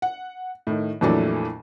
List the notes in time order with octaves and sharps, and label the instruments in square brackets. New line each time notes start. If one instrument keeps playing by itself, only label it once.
[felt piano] F#5
A2 D#3
F2 A#2 E3 F#3 A3 D4